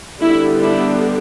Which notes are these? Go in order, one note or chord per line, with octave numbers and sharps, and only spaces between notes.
D3 G3 B3 D4 E4
E4